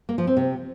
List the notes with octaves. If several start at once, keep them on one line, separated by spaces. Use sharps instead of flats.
A#3
F3
C4
C3